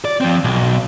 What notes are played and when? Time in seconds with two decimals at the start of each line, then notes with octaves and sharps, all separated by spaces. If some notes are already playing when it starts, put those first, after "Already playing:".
0.05 D5
0.21 F3 C4
0.44 B1